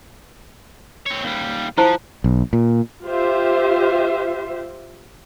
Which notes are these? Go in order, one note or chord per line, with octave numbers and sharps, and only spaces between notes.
C4 C#5
D#2 G3
F3 E4 C5 A5
B1
A#2
F4 G4 C5 E5